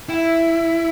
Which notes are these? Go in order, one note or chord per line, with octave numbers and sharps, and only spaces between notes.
E4 E5 G5